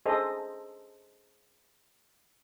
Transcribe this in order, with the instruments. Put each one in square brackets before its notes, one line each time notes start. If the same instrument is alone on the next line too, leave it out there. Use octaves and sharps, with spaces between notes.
[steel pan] G#4 A4 C5 D#5